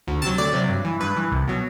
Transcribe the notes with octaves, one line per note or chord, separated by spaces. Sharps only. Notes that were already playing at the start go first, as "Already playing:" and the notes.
D2
C3 F#3 A5
D2 D5
C3 F#3
G2
E3
G2 B4
E3
C2
B2 F#3